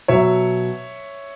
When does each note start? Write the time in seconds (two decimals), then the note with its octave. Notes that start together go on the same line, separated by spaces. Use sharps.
0.08 B2 F#3 C#5 E5